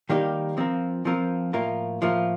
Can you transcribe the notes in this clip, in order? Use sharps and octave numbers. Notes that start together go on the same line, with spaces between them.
D#3 G3 A#3 D#4 G4
F3 C4 F4 A#4
F3 C4 F4 A#4
A2 F3 A#3 F4 A#4
A2 F3 A#3 F4 A#4